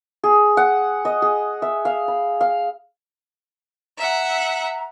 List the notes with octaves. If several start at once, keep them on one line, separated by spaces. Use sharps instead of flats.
G#4
F#5
D#5
G#4
E5
F5
B5
F5
E5 F#5 A#5